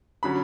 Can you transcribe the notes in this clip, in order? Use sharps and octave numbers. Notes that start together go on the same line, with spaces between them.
D3 F#3 C#4 B5